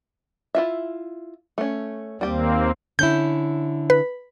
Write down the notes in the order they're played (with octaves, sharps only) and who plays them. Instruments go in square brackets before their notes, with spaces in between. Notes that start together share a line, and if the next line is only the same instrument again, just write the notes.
[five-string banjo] E4 F4 E5
A3 C#4
[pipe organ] D#2 A#3 C4 [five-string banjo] G3 G4
[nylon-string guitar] D3 C#4 E4 [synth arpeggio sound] G6
[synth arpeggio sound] B4